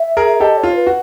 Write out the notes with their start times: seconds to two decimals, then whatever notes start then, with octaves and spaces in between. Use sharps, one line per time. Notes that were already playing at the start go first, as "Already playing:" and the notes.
Already playing: E5
0.17 G#4 A#4
0.40 G4 A4 D#5
0.57 C#5
0.63 F4
0.75 B4
0.87 F#4